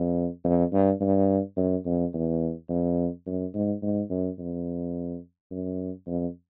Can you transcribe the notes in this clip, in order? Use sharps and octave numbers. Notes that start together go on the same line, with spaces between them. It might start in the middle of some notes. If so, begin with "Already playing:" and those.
Already playing: F2
F2
G2
G2
F#2
F2
E2
F2
F#2
G#2
G#2
F#2
F2
F#2
F2